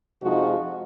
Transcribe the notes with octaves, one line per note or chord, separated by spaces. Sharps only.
F2 C3 F3 G#3 D#4 F#4